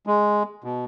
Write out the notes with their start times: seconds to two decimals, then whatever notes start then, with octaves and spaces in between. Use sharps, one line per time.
0.07 G#3
0.64 B2